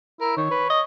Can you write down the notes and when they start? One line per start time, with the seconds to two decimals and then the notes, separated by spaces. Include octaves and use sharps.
0.21 E4 A#4
0.37 D#3 C#5
0.51 B4
0.70 D#5